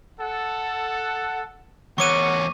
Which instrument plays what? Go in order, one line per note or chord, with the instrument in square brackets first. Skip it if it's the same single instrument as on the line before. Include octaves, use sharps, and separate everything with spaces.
[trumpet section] A4 F#5
[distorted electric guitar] E2 C#5 [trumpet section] B3 A#4 F#5 [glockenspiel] C#6 D6 D#7